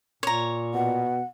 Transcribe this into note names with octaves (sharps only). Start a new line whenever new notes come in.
A#2 C#5 A#5
B2 F#5